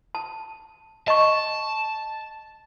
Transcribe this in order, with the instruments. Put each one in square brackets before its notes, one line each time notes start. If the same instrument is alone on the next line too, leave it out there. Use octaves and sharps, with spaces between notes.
[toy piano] A5
[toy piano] D#5 C#6 [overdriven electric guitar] A5